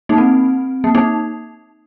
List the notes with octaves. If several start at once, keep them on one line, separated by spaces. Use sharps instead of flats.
A#3 D#4
C4
A#3
A#3 D#4